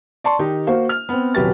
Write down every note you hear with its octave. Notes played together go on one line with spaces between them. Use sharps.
D5 A5 C6 C#6
D#3 D#4 G4
A#3 F#4 C5 F5
F6
B3 C4
D#1 C2 F#3 G4 B4 A6